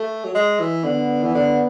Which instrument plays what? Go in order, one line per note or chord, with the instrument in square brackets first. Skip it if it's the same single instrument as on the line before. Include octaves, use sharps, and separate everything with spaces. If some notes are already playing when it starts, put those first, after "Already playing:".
Already playing: [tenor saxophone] A3
F#3
G#3
E3
[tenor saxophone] D3 [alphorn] B3
[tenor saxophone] E3
D3